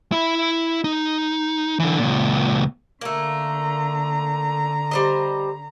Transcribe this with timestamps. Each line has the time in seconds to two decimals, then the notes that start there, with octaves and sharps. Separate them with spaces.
0.12 E4 B5
0.84 D#4
1.80 D3 E3
2.00 C#2 A#2
3.01 D3 A3 A#3 A#5
4.91 G3 C5 D#5